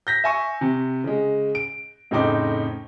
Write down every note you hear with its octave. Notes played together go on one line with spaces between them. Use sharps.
G6 A#6 B6
E5 G#5 C#6
C3
C#3 G#3
D7
F2 A2 C#3 C4 D#4 D6